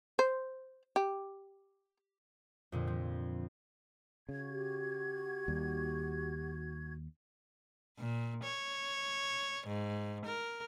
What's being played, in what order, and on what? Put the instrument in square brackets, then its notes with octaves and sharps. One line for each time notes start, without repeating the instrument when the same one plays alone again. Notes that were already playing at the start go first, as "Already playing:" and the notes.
[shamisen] C5
G4
[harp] F2 A#2 D3
F3
[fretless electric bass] C#3 [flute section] F#4 G#6
[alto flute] G4
[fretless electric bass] D#2 G3
[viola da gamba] A#2
C#5
G#2
A#4